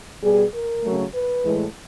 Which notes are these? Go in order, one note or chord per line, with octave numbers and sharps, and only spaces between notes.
B2 G3 G#4
A#4
C#3 F#3 A3
B4
A2 E3 G#3